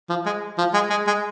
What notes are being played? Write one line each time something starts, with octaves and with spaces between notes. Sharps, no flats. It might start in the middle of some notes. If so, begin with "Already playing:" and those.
F3
G#3
F3
G#3
G#3
G#3